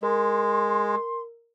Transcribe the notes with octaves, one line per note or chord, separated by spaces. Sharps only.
G#3 A#4 C6